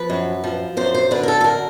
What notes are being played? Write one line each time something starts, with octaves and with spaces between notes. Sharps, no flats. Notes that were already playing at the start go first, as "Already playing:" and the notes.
Already playing: F3 B4
F#2
F3
F#2 C5
C5
D3 B4
A#4
A4
A4
F#2 A#4